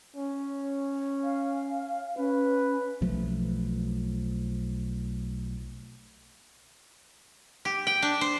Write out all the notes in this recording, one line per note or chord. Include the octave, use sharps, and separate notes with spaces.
C#4
F5
C#4 B4
B1 F3 A3
G4
G5
D4
C5